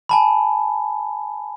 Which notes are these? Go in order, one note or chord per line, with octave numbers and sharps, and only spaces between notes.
G#5 A5 B5